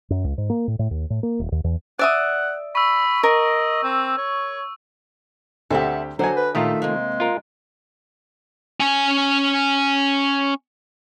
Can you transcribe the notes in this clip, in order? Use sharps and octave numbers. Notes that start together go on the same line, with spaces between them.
F#2
C#2
G#2
A#3
A2
A2
D#2
A2
A#3
D#1
D#2
E2
D5 E5 F#5 D#6
B5 C#6 E6
A#4 D#5
C4
C#5
D2 C4 G4 A4 E5 F#5
D3 F#3 F#4 C5 G#5
B4
A#2 D#3 A3 F4 G4 E5 A#5
C3 G#3 A#3
F4 A#4
C#4 G#5